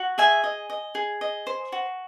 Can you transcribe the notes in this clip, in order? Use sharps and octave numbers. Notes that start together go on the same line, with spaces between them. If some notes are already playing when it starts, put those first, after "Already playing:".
Already playing: F#4
G#4 E5 G#5
D#5
D#5
G#4
D#5
C5
F#4